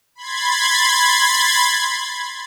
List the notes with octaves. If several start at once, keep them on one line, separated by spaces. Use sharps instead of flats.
B5 C6 G#6 A6